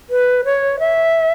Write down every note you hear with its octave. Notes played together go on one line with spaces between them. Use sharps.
B4
C#5
E5